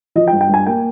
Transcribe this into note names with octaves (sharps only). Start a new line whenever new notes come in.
F3 D#5
G5
G2
G5
G2 G#5
A#3 G5